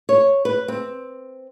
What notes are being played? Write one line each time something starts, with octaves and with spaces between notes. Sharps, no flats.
C#5
B4
C4